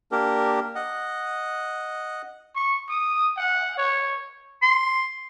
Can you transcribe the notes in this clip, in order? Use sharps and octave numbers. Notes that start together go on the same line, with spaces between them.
A#3 D4 G4 A#4
D#5 F#5
C#6
D#6
F#5
C#5
C6